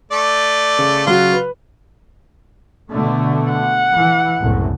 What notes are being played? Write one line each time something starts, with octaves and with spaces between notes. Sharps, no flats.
A3 D5
C#3
C#3 F#3 F4 F#4
B4
B2 D3 A3
F#5
E3
F#1 C2 A2